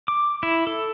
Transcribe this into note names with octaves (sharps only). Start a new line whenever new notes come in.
D6
E4
A4